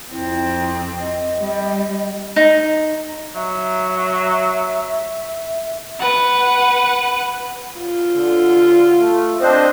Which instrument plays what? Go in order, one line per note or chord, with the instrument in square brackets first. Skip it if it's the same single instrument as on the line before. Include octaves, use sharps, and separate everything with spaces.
[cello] F2 C4 [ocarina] E4
[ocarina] D#5
[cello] G3
[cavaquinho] D#4
[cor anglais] F#3 [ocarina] E5
[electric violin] B4 F#5
[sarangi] F4
[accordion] D3
A3
[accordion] C4 D4 C5 [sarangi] D#5